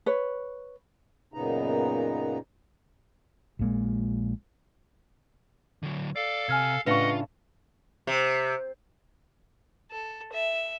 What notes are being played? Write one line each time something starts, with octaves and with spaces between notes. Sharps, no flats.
B4 C#5
F#2 A#2 C#3 B3 D#4 A#5
A#1 A#2 G#3
D3 F#3
A4 D5 F5 C7
C3 G#5 F6 G#6
A2 C#3 D4 F4 B4 D#5 F#5 C#6
C3
A4
E5